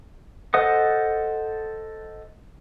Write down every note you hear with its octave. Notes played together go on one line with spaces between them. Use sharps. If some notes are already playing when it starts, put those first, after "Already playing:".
A4 C5 D#5 F#5 D#6